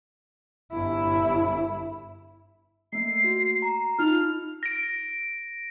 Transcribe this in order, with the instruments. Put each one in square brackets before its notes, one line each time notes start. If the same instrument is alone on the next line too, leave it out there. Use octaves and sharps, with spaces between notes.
[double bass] G1 E4
[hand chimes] A3 A#3 [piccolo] C7
[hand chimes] F#4
A#5
[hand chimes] D#4 F4 [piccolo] F6
[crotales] A#6 D7